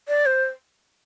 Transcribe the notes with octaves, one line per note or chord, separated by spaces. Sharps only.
D5
C5